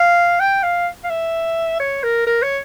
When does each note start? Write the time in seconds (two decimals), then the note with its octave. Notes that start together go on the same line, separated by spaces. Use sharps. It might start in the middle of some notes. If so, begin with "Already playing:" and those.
Already playing: F5
0.40 G5
0.63 F5
1.04 F5
1.10 E5
1.80 C#5
2.03 A#4
2.27 A#4
2.42 C#5